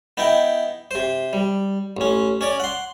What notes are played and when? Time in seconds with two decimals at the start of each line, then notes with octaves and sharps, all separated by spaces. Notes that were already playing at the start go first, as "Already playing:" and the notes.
0.17 B3 D#4 E4 G5
0.91 C3 C5
1.33 G3
1.97 A1 C#4
2.41 C#4 C#5 D5
2.60 F#5 C6